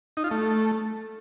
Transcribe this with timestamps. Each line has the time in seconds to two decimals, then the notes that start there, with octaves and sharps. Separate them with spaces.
0.17 D#4
0.24 F4
0.31 A3